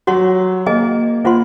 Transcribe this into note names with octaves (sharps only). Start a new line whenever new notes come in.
F#3 F#4 C#5 F#5 C6
A#3 G#4 D#5 G#5
A#3 F4 C5 F#5 C6